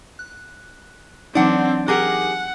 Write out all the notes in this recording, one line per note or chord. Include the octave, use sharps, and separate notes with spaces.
F#6
E3 F#3 C4 D4 D#4 F#5
G4 G#4 A#4 F#5